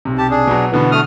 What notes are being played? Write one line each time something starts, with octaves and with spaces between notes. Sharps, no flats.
B1 C3
G4 A5
D4 G#4
B2 F#3
B2 D3 E3 B3
A3 D#6 F6